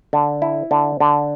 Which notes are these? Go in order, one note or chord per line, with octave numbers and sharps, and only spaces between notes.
D3
E4
D3
D3